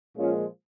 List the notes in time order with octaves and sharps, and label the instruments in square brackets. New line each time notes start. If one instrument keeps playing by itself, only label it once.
[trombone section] A#2 F3 G#3 C#4 F4